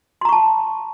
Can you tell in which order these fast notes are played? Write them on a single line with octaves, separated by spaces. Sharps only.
C6 A#5 C#6 A5